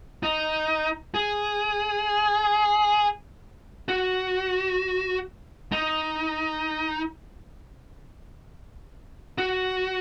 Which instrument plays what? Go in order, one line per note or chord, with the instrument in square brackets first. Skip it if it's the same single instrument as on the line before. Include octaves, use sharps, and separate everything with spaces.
[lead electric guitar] D#4
G#4
F#4
D#4
F#4